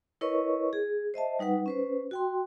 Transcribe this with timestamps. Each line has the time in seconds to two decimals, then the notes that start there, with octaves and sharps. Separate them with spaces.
0.21 E4 A#4 B4 C#5 D#5 C#6
0.73 G#4
1.14 C5 D#5 E5 A5
1.39 G3 D#4 B4 F#5
1.66 C#4 B4 C5
2.11 F#4 G5 C6